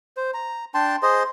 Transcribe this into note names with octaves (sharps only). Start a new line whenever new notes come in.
C5
A#5
D4 G5 A5 C6
G#4 C5 D#5 C6